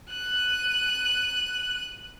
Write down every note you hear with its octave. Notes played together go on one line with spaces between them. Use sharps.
F#6 D#7